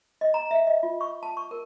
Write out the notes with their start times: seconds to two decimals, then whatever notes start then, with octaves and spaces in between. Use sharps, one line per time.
0.21 D#5
0.34 A#5
0.51 E5
0.67 D#5
0.83 F4
1.01 C#6
1.23 A5
1.37 C#6
1.51 A#4